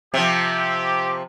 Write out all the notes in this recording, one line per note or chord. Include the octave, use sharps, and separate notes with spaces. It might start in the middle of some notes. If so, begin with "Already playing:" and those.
C3 F3 G4